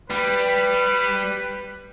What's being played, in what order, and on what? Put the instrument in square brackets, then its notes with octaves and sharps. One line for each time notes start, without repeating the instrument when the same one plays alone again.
[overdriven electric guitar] G3 [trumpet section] B4